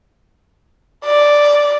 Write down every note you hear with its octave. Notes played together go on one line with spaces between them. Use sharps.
D5